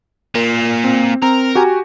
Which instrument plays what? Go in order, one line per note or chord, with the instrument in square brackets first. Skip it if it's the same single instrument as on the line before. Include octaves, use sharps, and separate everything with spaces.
[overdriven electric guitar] A#2 [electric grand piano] A#4
[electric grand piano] C4
[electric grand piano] C4 [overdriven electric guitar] A#4
[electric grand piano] F#4 G4 G#5